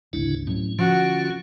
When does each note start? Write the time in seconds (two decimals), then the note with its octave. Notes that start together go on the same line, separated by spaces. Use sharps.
0.13 G#1 D2 C#3 D4 E4
0.47 A2 F#3 C#4
0.79 D3 F3 C#4 F4 F#4